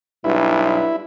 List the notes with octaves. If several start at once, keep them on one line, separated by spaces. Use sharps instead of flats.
B1 G2 E4